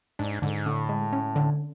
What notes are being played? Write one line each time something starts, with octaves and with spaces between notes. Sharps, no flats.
G#2 D4
G#2 D3
A2 D3
G#3
C#4
D3